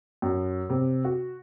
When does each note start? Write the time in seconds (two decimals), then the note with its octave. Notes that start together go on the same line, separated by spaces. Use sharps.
0.22 F#2
0.70 C3
1.04 F#4